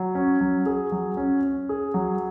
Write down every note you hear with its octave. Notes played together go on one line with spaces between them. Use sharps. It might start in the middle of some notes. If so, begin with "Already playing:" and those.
Already playing: F#3
C#4
F#3
G#4
F#3
C#4
C#4
G#4
F#3